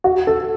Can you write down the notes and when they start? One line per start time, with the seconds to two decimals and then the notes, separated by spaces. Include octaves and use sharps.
0.04 F#4
0.27 A4